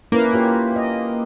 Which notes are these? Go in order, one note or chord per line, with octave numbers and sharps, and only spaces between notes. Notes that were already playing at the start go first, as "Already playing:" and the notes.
A#3 C#4 E4 B4
F4 G4 C#5
D#5